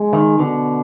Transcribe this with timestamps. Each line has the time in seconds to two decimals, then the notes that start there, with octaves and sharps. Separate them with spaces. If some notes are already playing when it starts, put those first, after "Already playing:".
Already playing: G#3
0.13 D#3
0.39 B2 D3